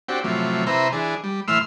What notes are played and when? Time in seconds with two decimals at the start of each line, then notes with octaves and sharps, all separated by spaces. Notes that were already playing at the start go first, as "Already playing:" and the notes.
0.08 C4 D4 F#4 G4
0.24 A2 C3 F3 F#3
0.67 C3 E4 B4 C5 A#5
0.92 E3 D4 G#4
1.24 G3
1.48 A2 E3 C6 E6 F6